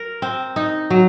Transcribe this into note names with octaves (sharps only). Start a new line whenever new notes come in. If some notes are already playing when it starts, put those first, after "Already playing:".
Already playing: A#4
C4
D#4
F#3